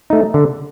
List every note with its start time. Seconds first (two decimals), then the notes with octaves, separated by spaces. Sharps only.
0.10 A3 D#4
0.34 D3